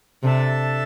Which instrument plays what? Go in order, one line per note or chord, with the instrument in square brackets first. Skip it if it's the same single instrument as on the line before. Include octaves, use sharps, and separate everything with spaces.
[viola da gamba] C3 [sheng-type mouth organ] D4 A4 E5 A5